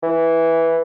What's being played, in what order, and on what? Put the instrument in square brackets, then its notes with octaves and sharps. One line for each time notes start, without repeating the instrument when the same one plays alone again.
[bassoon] E3